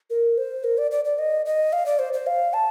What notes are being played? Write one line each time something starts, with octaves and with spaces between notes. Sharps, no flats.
A#4
C5
A#4
D5
D5
D5
D#5
D#5
F5
D5
C5
C5
F5
A5